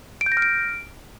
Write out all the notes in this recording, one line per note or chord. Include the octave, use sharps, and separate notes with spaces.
D7
G6
A#6
F6
D7